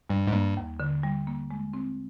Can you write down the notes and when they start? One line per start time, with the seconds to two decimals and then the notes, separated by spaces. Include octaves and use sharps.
0.09 G2 G3
0.27 G#2
0.33 G2 A#3
0.57 D#2
0.80 D3
1.03 G3
1.27 A#3
1.51 G#3
1.73 C4